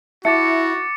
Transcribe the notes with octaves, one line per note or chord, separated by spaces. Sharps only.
E4 F#4 E5 A5 D6 A6 C#7